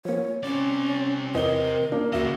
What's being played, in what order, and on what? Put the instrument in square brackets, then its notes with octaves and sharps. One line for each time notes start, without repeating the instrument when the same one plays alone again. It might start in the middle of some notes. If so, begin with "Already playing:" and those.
[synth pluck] F3 A#3 [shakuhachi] C#5
[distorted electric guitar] C3 D5 [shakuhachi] C#4
[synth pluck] E2 E3 A#6 [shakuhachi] A#4 [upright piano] D#5 G7
[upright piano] A#3 [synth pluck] D4
[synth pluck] D#2 E5 E7 [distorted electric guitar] C#3 D#5 [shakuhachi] F#4